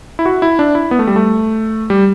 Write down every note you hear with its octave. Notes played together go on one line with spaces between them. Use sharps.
E4
F#4
E4
D4
E4
B3
A3
G3
A3
G3